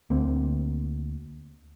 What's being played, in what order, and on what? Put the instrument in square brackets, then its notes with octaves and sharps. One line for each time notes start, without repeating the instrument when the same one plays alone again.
[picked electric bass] D2 A#3 C4